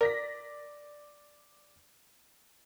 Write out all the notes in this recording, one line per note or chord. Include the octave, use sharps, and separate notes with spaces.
A#4 D5 A#6 B6